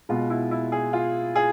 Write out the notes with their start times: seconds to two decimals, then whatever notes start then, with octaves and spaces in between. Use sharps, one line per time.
0.09 B2 G#3 B3 F4
0.30 E4
0.51 E4
0.72 G#4
0.93 F4
1.35 G#4